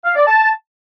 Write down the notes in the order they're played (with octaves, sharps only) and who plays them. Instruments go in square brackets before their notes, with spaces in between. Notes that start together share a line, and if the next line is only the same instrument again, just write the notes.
[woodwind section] F5
D5
A5